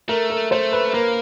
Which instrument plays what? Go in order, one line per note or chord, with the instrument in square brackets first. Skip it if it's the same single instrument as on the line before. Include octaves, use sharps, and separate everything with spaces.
[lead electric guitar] A3 [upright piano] A#4
[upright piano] A#4
[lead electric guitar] A3 [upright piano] C5
[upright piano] B4
[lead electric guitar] A#3 [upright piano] A#4